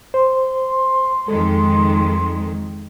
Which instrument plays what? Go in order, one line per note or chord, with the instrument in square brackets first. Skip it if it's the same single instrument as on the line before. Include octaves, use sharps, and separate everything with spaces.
[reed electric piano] C5 [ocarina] C6
[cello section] F2 D#3 G#3 [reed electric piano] A4